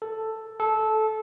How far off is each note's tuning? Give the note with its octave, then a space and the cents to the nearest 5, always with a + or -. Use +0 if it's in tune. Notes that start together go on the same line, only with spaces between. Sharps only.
A4 +5
A4 -15